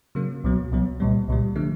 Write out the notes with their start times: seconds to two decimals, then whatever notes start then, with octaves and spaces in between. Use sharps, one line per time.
0.15 C#3 F#3 A#3
0.44 C2 B2 F#3
0.72 C2 B2 F#3
1.00 C2 A#2 G3
1.28 C2 A#2 G3
1.56 D3 F3 A3